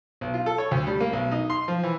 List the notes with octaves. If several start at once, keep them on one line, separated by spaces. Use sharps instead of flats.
B1
F4
A4
C#5
D2
G3
A#3
B1
D#4
C6
F3
E3